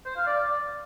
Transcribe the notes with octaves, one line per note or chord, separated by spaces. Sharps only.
C5
F5
D5